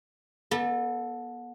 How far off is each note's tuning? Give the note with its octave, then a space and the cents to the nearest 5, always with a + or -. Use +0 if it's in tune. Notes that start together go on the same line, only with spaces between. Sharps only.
B3 -35 A4 +0 D5 +45